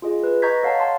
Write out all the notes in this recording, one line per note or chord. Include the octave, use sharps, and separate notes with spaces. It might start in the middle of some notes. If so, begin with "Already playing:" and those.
F4 G#4 D#5
B4
D#5 A#5 C#6 G6 G#6 B6
A4 C#5 F5 F#5 A5
A5 C6